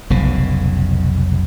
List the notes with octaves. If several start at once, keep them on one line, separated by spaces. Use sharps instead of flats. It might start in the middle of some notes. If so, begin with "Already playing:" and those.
F1 B1 C#3